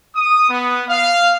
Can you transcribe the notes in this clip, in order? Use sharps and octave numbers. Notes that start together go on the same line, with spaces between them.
D#6
B3
F5